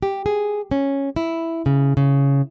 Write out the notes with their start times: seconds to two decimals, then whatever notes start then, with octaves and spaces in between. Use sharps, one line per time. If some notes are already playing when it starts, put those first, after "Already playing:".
0.03 G4
0.26 G#4
0.71 C#4
1.16 E4
1.66 C#3
1.97 C#3